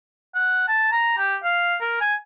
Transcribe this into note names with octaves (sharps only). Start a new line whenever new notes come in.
F#5
A5
A#5
G4
F5
A#4
G#5